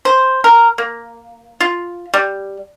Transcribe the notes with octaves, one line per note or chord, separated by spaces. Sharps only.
C5
A#4
A#3
F4
G3